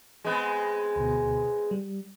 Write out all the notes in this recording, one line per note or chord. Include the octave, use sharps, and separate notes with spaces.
G#3 B3 C4
D2 B2
G3